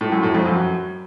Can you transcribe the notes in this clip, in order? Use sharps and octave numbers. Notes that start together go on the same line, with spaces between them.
A2
F#2
A2
F2
F#2